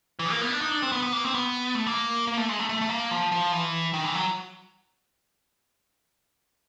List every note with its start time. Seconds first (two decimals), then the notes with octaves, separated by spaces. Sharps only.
0.19 E3
0.31 A#3
0.41 B3
0.50 D4
0.61 D#4
0.71 D4
0.83 C4
0.92 B3
1.02 B3
1.13 A#3
1.24 C4
1.34 B3
1.75 A3
1.87 A#3
2.27 A#3
2.37 A3
2.49 G#3
2.59 A3
2.69 A3
2.81 A3
2.89 A#3
3.11 F3
3.32 F3
3.52 E3
3.93 D#3
4.04 E3
4.15 F#3